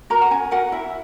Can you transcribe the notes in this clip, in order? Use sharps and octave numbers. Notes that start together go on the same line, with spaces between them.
F#4 A#4 A#5
F#5
C#4 G#5
F#4 A#4 F#5
E4 E5